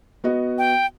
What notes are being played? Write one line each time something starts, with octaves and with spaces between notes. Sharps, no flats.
B3 F#4 D#5
G5